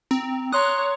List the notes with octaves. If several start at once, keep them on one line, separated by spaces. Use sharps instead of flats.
C4 A#5
C#5 A#5 C6 D#6 F#6